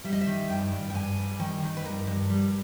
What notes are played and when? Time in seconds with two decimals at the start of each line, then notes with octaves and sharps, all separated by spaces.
0.04 G3 E5
0.13 D#5
0.21 E5
0.27 D#3
0.49 G2 G5
0.72 G2
0.90 G5
0.94 G2 G#5
1.17 G3
1.40 D#3 G5
1.62 D#3
1.77 B4
1.85 G2 A#4
2.07 G2
2.30 G3